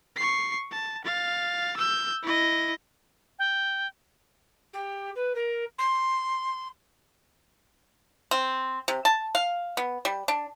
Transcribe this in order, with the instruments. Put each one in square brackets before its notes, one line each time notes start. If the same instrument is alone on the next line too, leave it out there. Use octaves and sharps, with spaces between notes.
[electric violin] C#6 C7
A5
F5 A6
E6 G6
E4 D#5
[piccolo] G5
[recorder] G4
B4
A#4
C6
[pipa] C4
C3
A5
F5
B3
G3
D4